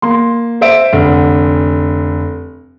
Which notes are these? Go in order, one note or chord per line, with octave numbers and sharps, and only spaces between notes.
A#3 C6
C5 E5 D7
F1 D3